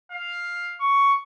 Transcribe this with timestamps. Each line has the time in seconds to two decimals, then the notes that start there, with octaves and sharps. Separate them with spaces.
0.12 F5
0.81 C#6